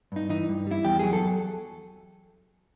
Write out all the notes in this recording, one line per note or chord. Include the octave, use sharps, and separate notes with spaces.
G2 D#4
E3 D#4
G2
G3 E4
E2 G4
F#3 G#4
A4